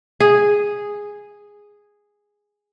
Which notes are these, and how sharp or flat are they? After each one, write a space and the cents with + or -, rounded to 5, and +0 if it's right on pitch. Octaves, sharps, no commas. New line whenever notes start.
G#4 -5